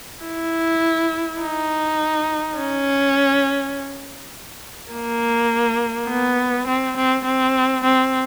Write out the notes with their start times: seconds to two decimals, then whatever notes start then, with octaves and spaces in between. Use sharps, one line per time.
0.24 E4
1.41 D#4
2.57 C#4
4.92 A#3
6.09 B3
6.67 C4
6.96 C4
7.25 C4
7.84 C4